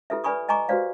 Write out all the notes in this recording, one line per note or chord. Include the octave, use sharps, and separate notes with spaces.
E4 G4 A4 B4 E5
B4 D5 G#5 B5 C#6 D#6
D#5 G#5 A#5 C#6 D6
F#4 G4 B4 C5 D5 F5